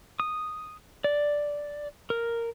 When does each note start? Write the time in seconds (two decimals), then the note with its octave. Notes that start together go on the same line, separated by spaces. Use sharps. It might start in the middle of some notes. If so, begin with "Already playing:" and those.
0.20 D#6
1.04 D5
2.10 A#4